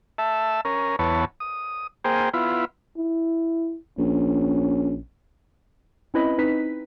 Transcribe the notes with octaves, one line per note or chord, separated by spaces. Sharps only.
E5 A5
C#4 A#4
E2 B3 C#5 A5
D#6
A#3 G#4 C5 G5
B3 E4 F4
E4
A#1 C#4
C4 C#4 E4 B4 D#5 B5
C4 D#4 B4 B6